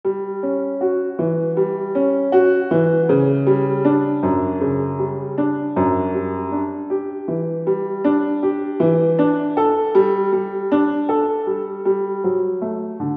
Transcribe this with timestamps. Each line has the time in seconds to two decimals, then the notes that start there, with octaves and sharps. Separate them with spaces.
0.05 G3
0.43 C#4
0.81 F#4
1.19 E3
1.57 G3
1.95 C#4
2.32 F#4
2.71 E3
3.09 C#3
3.47 G3
3.85 D4
4.23 F#2
4.61 C#3
4.99 G3
5.38 D4
5.76 F#2
6.14 G3
6.52 D4
6.90 G4
7.28 E3
7.67 G3
8.04 D4
8.43 G4
8.80 E3
9.19 D4
9.57 A4
9.95 G3
10.32 G3
10.72 D4
11.09 A4
11.47 G3
11.85 G3
12.24 F#3
12.62 A3
13.00 D3